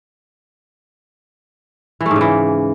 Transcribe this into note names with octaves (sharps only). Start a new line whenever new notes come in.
E3
A3
G#2
C#3
E3